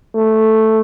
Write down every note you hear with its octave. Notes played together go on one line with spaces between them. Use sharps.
A3